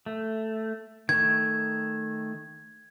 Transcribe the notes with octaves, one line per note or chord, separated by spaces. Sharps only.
A3
D#3 A3 G#6